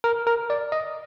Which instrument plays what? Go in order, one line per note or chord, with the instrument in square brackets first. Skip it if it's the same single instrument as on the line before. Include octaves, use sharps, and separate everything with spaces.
[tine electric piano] A#4
A#4
D5
D#5